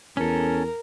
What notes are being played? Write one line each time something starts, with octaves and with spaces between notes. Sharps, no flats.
E2 C#4 A4 A#4